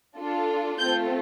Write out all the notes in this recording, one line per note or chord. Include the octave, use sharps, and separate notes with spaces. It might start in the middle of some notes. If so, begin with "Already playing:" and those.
D4 F4 A4
A3 C4 F4 A4 G6